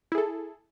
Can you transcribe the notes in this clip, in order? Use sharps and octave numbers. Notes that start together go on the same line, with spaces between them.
E4 G#4 A4